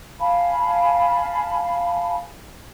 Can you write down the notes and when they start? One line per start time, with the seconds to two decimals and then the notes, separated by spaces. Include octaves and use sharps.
0.20 F5 G#5 A5 B5